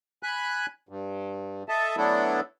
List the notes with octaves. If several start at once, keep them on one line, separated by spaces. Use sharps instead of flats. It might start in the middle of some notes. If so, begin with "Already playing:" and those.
G#5 B5 F#6
G2
A4 D#5 E5 A5
F#3 A3 B3 D4 E4 A4